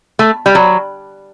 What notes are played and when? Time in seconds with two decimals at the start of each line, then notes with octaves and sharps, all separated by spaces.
0.19 A3
0.46 G3
0.55 F#3